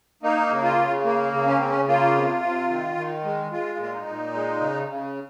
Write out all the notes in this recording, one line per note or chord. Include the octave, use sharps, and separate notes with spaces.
A#3 D#4
C#3
F4
C#3
A#3
C#3
C#4
C#3 C4
C#4
A#3 F4
C3
C3
D#3
D#3
G#3
G#3 F4
A#2 F4
D#4
A#2
G#3
C#3
C#3